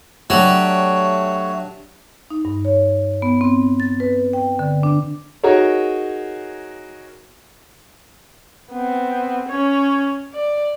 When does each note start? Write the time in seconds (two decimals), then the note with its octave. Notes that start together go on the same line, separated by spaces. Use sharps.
0.30 F#3 A3 D4 G4 C#5
2.30 D#4
2.45 G2
2.65 C#5
3.22 B3
3.41 C4
3.80 A6
4.00 B4
4.33 G5
4.59 D3
4.83 D4
5.44 D#4 F#4 G#4 A#4 C#5
8.71 B3 C4
9.48 C#4 C#5
10.34 D5